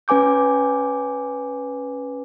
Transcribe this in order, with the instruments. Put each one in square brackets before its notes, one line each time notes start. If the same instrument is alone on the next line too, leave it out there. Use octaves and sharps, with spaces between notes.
[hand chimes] C#4 B4 G#5 D6 G6